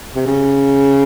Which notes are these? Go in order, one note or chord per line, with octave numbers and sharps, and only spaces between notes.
C3
C#3